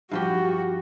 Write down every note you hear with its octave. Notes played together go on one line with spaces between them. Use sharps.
G2 F3 F#4 G4